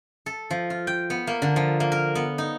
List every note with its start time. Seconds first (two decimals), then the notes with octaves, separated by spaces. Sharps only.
0.26 A4
0.51 F3
0.70 F4
0.87 G5
1.10 B3
1.27 A#3
1.42 D3
1.56 F3
1.80 A#3
1.92 A#4
2.15 B3
2.38 D#4